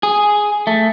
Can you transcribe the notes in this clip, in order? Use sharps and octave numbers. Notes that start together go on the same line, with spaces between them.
G#4
A3